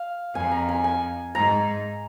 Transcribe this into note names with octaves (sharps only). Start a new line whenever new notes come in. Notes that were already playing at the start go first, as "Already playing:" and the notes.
Already playing: F5
F2 G#5
A#5
G#5
G#5
G#2 A#5